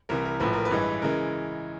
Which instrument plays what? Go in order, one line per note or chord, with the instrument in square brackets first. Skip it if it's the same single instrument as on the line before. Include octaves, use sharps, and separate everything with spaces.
[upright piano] C2 C3 E3 A#4
A#4
A#1 A2 F3 B4
A#4
B4
A1 G2 E3 G#3
C#3 E3 G#3 A#4